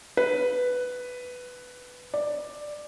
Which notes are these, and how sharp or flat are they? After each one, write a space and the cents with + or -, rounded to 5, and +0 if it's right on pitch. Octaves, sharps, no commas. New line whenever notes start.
B4 +5
D5 +10